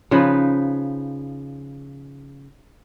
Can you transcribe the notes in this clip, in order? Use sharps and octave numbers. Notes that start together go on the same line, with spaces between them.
C#3 F3 D#4 B4